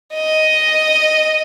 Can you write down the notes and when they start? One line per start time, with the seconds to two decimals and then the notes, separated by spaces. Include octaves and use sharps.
0.14 D#5